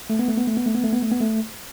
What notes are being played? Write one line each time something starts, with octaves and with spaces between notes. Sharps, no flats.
A3
B3
A3
B3
A3
B3
A3
B3
A3
B3
A3
B3
A3